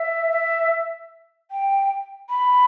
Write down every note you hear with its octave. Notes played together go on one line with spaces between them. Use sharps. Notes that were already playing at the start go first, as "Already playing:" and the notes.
Already playing: E5
E5
G5
B5